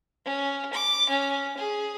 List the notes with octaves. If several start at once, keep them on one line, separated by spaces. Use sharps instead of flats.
C#4
D6
C#4
G#4